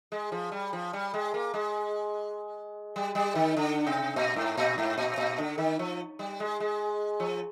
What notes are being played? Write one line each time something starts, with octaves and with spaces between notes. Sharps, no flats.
G#3
F3
G3
F3
G3
G#3
A#3
G#3
G3
G3
D#3
D3
C3
A#2
G#2
A#2
G#2
A#2
A#2
D3
D#3
F3
G3
G#3
G#3
F3